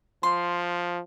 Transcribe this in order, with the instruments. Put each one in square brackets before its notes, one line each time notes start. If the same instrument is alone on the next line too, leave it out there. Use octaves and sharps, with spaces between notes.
[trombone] F3 [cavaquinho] C6